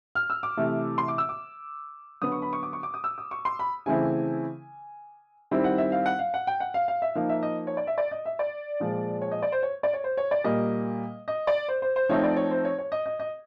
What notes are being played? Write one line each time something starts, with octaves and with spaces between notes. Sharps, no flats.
F6
E6
D6
C3 E3 A3
C6
D6
E6
D6
D3 F#3 B3 D#6
C#6
B5
C#6
D6
C#6
D6
D#6
E6
D#6
C#6
C6
B5
C#3 E3 A3 C4 E4 G#5
D#3 G3 C4 E4
F#5
E5
F5
F#5
F5
F#5
G5
F#5
F5
F5
E5
F3 A#3 D#4 F5
E5
D#5
C#5
D5
E5
D5
D#5
E5
D5
A#2 F3 G#3
C#5
D#5
D5
C5
C#5
D5
C#5
C5
C#5
D5
A#2 G3 A#3 D#5
D#5
D5
C5
C5
C5
F3 A3 C4 D#4 C#5
D5
C#5
C5
C#5
C#5
D#5
D#5
D#5